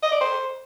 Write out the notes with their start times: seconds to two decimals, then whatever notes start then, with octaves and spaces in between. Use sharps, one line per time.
0.03 D#5
0.12 D5
0.21 C5